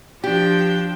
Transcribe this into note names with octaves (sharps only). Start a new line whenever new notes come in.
F3 D4 G4 G5